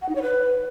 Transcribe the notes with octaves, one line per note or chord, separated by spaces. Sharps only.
F#5
D#4
C#5
B4